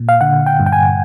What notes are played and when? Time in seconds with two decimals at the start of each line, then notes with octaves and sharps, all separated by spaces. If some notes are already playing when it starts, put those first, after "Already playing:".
Already playing: A#2
0.09 F5
0.21 D3 F#5
0.46 G5
0.60 G2
0.66 G5
0.72 G#5